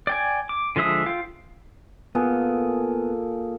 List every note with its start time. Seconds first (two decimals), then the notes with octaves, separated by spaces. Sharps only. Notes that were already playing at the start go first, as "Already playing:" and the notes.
0.07 D5 G5 G#5
0.49 D6
0.76 D3 F3 G#3 E5 D#6
1.06 F4 F5 G5
2.15 A#2 B3 G#4 A4